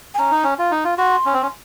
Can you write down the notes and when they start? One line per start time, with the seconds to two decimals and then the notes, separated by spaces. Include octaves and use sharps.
0.14 G#5
0.19 C#4 A#5
0.31 D#4
0.44 C#4
0.59 F4
0.71 D#4
0.84 F4
0.98 F#4 C6
1.26 C#4
1.34 C4
1.43 C#4